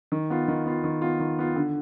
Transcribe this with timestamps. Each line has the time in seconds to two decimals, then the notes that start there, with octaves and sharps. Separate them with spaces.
0.12 D#3
0.30 B3 F4
0.48 D#3
0.66 B3 F4
0.84 D#3
1.02 B3 F4
1.20 D#3
1.39 B3 F4
1.56 D3